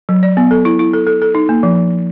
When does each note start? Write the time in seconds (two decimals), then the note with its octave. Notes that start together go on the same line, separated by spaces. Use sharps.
0.09 F#3
0.23 D5
0.37 B3
0.51 A4
0.65 E4
0.79 E4
0.93 A4
1.07 A4
1.22 A4
1.35 D#4
1.49 A#3
1.63 F3